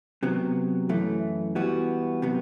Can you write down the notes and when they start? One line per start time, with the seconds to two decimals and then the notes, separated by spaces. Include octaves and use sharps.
0.23 C3 F#3 B3
0.89 F#2 E3 A3
1.55 E3 G3 B3 F#4
2.22 C3 F#3 B3